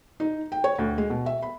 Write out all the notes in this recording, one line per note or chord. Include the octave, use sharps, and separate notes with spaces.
D#4
G5
C#5
D2
G#3
B2
E5
B5